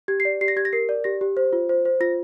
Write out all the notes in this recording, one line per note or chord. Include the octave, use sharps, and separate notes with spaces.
G4 G#6
C7
D5
G4 C7
A#6
G4 G#6
A#6
A#4 C7
D5
G4 A#6
G4
C5
F4
C5
C5
F4 A#6